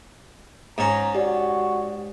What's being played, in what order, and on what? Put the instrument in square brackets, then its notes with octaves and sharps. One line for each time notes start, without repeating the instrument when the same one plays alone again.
[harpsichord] G#2 C#4 [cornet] A#5
[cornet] F#4 [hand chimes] G4 D5